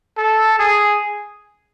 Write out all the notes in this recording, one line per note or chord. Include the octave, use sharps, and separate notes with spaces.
A4
G#4